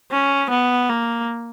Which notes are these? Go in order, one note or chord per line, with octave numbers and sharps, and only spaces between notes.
C#4
B3
A#3